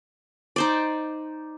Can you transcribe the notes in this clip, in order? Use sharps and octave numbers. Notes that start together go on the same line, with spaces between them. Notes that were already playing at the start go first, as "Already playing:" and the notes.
D#4 C5 D5